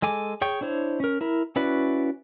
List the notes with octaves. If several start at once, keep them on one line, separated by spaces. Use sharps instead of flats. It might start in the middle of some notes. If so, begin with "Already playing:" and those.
G#3 A4 G#5 D6
G#4 C#5 G5 C#6
D4 E4 C5 C#5
C#4 A#4
E4 A#4
C#4 E4 F#4 B4 D5